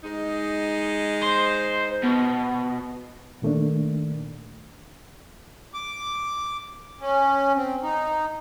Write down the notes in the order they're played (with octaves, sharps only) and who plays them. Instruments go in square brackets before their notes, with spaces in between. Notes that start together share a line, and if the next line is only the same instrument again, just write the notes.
[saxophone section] G#3 D#4
[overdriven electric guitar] C5
B2
[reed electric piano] A#2 D#3 A3 A#3 D4
[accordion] D6
C#4
C4
D#4